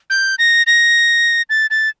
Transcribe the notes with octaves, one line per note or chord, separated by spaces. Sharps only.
G6
A#6
A#6
A6
A6